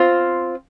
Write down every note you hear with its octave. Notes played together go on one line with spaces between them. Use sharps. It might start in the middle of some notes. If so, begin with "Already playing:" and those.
Already playing: C4 F4 C5